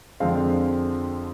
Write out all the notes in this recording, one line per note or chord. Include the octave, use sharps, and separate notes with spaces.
F2 D3 F3 G#3 C4 F5